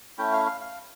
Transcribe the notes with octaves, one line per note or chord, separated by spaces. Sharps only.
A3 C#4 E4 G5
F5
F5
F5